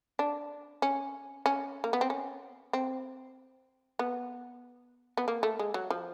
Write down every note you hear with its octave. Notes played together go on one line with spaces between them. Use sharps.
D4
C#4
C#4
A#3
B3
C4
C#4
C4
B3
B3
A#3
A3
G#3
F#3
F3